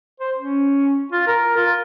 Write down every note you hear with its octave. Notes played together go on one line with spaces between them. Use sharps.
C5
C#4
F4
A#4
F4